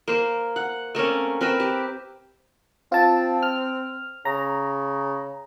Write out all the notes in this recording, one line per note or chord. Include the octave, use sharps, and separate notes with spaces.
A#3 C5
F#5
A3 A#3 C4 C#4
C4 A#4 B4 E5
G4
C4 F4 A5
F6
C#3 A#5